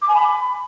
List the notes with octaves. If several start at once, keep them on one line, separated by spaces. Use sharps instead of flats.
D6
G#5
B5